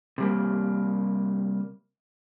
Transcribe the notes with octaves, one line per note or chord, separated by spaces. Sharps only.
C3 G3 A#3